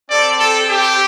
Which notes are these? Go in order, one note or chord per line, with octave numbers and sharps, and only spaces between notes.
C4 G4 A4 D5
A4
G4